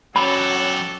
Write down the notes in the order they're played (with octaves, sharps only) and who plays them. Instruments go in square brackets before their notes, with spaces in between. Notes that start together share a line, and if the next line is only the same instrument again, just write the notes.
[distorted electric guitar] F#3 G4 [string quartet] C#4 F#4 [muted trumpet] A4 [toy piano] B5